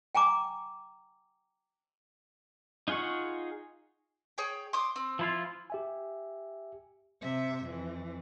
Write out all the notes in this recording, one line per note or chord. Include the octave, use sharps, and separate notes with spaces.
G5 G#5 A#5 D6
D#4 F4 G#4 F#5 C#6
G#4 C#5 G5
C6 D6 D#6
C4
F3 E4 F4
G4 E5 G#5
C3 E5
F2 E3